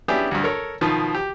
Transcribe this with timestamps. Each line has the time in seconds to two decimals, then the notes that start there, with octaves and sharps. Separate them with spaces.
0.08 B3 C#4 D4 E4 G4 G#4
0.31 D2 G2
0.44 A4 A#4 C#5
0.81 B2 D#3 F3
1.15 G4